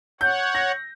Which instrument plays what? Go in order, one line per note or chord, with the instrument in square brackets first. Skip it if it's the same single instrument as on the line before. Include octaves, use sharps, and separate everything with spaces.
[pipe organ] C#5 F#5 [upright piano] G6
[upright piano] A#6